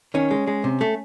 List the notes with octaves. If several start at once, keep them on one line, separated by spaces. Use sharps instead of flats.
D#3 C#4
G#3
G#3
C3
A3